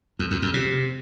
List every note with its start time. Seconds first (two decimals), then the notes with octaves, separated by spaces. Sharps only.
0.19 F2
0.31 F2
0.42 F2
0.54 C3